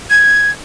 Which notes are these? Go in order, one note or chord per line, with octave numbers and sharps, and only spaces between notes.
G#6